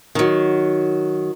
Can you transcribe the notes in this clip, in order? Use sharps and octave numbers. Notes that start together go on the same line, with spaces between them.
D#3 F#3